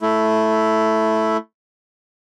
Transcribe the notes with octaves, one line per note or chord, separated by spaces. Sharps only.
A3 E4